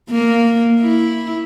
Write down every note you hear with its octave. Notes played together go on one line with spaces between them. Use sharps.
A#3
E4